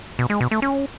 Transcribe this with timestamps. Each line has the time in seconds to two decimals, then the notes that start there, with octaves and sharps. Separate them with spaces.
0.19 B2
0.30 G#3
0.41 B2
0.51 A3
0.62 C#4